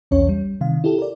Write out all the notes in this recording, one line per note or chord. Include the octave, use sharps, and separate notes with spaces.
B1 E2 C#4 C#5
G3
C3 D#3 F5
E4 F4 G4 A4
A#4 D5